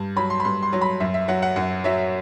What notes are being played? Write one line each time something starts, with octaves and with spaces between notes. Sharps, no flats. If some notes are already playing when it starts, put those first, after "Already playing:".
Already playing: G2
F#3 B5
C6
B5
G2 C6
C6
F#3
B5
F#2 E5
E5
F#3 F#5
F#5
F#2 F#5
F#3 E5